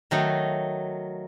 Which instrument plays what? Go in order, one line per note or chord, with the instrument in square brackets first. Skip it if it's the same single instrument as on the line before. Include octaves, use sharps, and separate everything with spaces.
[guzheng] D#3 F#3 A3 D#4